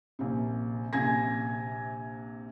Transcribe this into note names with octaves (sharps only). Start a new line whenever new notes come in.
A#1 C3
A#1 C3 G#5 G#6 A#6